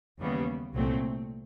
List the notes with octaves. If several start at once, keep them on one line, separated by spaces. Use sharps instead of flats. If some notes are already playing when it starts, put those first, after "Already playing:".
D#2 C#3 E3 G3 B3
C2 A#2 F#3 A3 C4